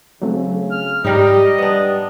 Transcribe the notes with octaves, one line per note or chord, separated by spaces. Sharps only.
C#3 F#3 A3 C4
F6
G#2 G3 D#4 G4 D#5 A#5 F6
G3 B3 D4